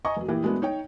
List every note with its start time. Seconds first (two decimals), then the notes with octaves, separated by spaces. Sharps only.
0.05 D#5 G#5 A#5 C#6 D#6
0.17 F1 F#3
0.28 A#2 E3 G4
0.43 F#3 G#3 A3 B3 D4
0.62 D#4 C#5 G5